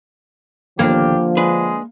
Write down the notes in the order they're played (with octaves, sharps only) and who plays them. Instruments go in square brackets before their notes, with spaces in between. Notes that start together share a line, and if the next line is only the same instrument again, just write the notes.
[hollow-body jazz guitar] D#2 B2 D4 [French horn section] D3 F3 [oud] A#3 [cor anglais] G4
[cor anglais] G#3 [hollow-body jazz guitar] D4 B4